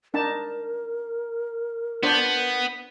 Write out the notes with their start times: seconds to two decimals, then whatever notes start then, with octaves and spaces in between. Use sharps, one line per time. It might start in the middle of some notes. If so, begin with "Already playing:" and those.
0.14 D4 D#4 A#4 A5
2.03 B3 D4 C5